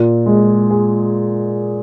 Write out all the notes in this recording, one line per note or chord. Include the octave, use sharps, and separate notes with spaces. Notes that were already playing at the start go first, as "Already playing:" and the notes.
Already playing: A#2
G#3
G#4